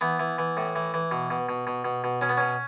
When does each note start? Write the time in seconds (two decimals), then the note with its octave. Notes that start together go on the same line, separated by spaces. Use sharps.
0.01 E3 B3
0.19 E3
0.38 E3
0.57 A2
0.76 E3
0.94 E3
1.11 B2
1.30 B2
1.49 B2
1.67 B2
1.84 B2
2.04 B2
2.21 B2 C#4
2.29 B3
2.37 B2 C#4